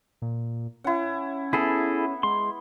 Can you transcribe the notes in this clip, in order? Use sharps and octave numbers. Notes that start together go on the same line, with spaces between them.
A#2
C#4 E4 F#5
B3 E4 G#4 A4
G#3 C6